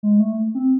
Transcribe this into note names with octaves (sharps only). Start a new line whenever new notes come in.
G#3
A3
C4